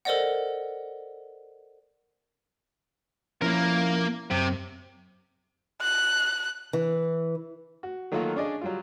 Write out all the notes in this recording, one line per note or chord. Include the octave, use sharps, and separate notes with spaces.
A4 A#4 C5 D5 D#5 F#5
F3 A#3 C#4 E4 A#4
F#2 C3
F#6
E3
F#4
D#3 F#3 A3 A#3 F4 F#4
C#4 D4 G#4 D5 D#5
F#3 G3 F4